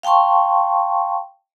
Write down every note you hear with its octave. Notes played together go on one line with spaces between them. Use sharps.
F5 G5 A5 C6 C#6